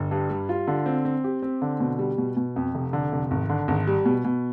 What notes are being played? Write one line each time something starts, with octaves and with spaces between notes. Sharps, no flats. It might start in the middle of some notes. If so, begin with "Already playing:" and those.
Already playing: G1
G2
G3
F4
D3
C4
C4
G4
C4
D3
B2
G3
B2
B2
F2
F1
D3
F1
G#1
D3
G#1
G3
B2
B2